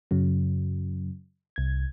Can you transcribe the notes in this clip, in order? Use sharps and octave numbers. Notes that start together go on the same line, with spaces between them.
F#2 C#3 F#3
C2 G#6